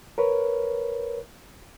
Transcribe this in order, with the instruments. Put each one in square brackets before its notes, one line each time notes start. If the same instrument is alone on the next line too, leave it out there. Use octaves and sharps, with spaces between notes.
[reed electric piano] A#4 B4 C#5